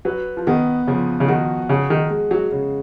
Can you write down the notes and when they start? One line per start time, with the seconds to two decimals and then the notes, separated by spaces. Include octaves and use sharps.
0.05 F#3 B4
0.37 F3
0.47 D#3 B3
0.87 C#3 F3
1.20 C#3
1.28 D#3 F#4
1.69 C#3 G#4
1.90 D#3
2.10 G#3
2.31 F#3
2.52 C#3